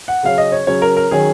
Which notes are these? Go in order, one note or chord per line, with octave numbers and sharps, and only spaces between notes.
F#5
C#3 F#3 C#4 F5
D#5
C#5
C#3 F#3 C#4 C#5
A#4
A#4
D#3 F#3 C#4 G#4